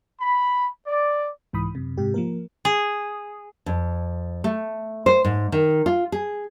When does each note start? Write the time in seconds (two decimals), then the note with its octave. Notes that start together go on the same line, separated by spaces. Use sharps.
0.21 B5
0.87 D5
1.53 C2 G#2 E3 B5 D#6
1.75 F#2 C3
1.98 G#2 C3 G4
2.14 F3 A#3 A#4
2.65 G#4
3.66 F2
4.44 A3
5.06 C5
5.25 G#2
5.52 D#3
5.86 F4
6.12 G#4